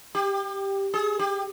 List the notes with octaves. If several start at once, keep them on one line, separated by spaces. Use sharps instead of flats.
G4
G#4
G4